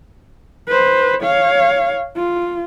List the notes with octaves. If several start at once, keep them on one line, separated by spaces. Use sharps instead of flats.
B4 C5
C#5 F5
F4